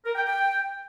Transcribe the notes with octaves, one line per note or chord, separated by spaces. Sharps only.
A#4
G5
G5